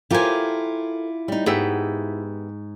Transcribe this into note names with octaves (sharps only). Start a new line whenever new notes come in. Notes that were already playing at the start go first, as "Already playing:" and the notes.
E4 F4 G4 A4 A#4 C5 G#5
G3 D#4
G#2 B3 G4 E5